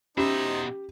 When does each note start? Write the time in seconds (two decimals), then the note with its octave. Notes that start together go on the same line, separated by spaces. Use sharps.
0.17 B2 C#4 D#4 G4 C5 E5